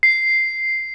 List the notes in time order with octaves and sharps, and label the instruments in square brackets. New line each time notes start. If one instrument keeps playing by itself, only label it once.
[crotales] C7